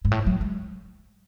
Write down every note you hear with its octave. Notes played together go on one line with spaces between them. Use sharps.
G#2
A2
F#3
G#3